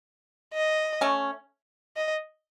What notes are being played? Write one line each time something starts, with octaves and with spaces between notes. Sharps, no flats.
D#5
A3 C#4
D#5